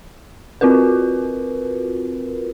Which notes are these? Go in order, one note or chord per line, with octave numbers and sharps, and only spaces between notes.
C4 F4 F#4 A#4 B4